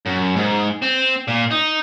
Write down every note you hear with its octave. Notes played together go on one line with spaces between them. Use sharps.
F#2
G#2
C4
A#2
D#4